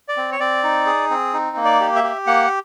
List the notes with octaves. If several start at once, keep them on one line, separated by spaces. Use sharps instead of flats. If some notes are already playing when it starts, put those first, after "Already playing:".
D5
C4
C#5
C4 D5
D#4
G#4
C4
D#4
A#3
D5
G4
E5
G4
A#3 F#5